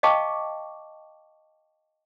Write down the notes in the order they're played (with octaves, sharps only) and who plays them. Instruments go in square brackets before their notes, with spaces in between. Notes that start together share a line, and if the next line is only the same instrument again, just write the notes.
[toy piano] D#5 F5 G5 A5 C#6 D6